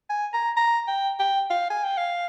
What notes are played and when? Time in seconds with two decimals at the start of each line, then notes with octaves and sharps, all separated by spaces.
0.10 G#5
0.34 A#5
0.57 A#5
0.88 G5
1.19 G5
1.51 F5
1.70 G#5
1.84 G5
1.97 F5